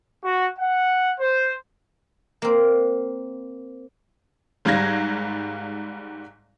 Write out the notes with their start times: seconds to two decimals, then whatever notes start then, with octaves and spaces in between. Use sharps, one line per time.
0.24 F#4
0.58 F#5
1.20 C5
2.42 A#3 C4
4.65 G#1 G#2 G3 F5 G#6 A#6